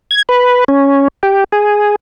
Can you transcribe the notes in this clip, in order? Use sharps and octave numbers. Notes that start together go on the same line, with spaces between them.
G#6
B4
C#4
G4
G#4